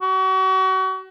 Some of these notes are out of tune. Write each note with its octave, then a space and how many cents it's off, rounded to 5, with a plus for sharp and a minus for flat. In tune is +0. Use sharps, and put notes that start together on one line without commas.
F#4 +35